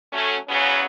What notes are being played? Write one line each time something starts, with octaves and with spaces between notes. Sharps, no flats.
F#3 A3 C#4
E2 C#3 F#3 B3 C#4